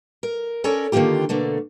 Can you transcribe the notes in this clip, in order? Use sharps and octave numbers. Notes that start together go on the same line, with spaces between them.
A#4
C#4 A4 A#4 C#5 D5
D3 D#3 A#3 B3 F4 G4
B2 D3 A3 A#3